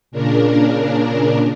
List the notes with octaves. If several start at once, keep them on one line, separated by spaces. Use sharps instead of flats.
A#2 C#3 D4 A#4